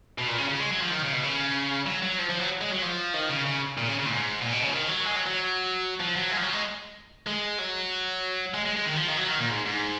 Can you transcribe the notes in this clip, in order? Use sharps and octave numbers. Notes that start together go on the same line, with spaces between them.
B2
A#2
C#3
C#3
G#3
F#3
F3
D#3
C#3
B2
C#3
F#3
F#3
F3
F3
F#3
G#3
F#3
F3
D#3
C#3
C#3
A#2
C#3
C#3
A#2
G#2
A#2
B2
C#3
F3
D#3
F#3
G#3
F#3
F#3
F3
F#3
G#3
F3
F#3
G#3
G#3
F#3
G#3
G#3
G#3
D#3
F3
D#3
F#3
D#3
A#2
G#2
G#2